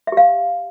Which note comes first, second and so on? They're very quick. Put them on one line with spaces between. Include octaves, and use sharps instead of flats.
E5 G4 F5